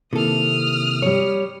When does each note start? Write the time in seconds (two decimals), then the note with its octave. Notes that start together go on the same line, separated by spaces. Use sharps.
0.13 C3 D#3 A#3 E4 A4 D#6 F6
1.02 G3 C#5